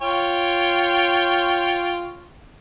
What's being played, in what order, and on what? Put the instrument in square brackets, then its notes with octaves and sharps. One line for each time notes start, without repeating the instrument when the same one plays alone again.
[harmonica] F4 C#5 G5